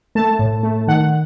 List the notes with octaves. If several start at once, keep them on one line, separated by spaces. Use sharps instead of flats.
A3 A5
A2
A3
D#3 F#5